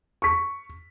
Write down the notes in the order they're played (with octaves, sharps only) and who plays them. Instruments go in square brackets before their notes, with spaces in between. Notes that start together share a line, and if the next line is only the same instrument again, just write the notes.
[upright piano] C#6 B6